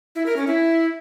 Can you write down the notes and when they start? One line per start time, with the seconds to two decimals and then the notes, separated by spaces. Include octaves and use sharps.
0.15 E4
0.26 A#4
0.37 C#4
0.47 E4